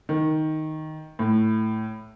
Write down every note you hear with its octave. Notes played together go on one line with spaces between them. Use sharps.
D#3
A2